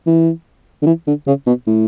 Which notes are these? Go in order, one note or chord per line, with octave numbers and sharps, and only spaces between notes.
E3
D3
E3
D3
C#3
B2
A2